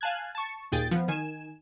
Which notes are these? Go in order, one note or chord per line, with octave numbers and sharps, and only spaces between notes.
F5 G#5 A5 F#6 G#6
A5 C#6
D#2 A#2 G#4 G5 G#5 A6
F3 B3
D#3 G#5 E7